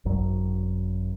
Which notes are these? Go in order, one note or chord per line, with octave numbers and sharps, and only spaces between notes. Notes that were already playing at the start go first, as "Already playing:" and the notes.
G#1 F#2 F#3